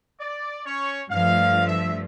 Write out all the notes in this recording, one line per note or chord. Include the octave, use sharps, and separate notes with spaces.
D5
C#4 C#5
G2 F3 A3 F5
E5